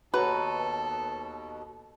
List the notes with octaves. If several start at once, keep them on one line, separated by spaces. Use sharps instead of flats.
D#2 B2 F#4 A4 B4 C#5 A#5